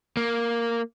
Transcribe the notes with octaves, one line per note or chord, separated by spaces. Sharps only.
A#3